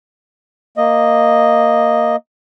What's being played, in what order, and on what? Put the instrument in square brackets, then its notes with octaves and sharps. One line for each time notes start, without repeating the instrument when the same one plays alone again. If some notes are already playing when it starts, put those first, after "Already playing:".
[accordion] A#3 D#5